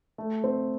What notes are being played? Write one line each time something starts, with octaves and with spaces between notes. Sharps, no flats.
A3
C4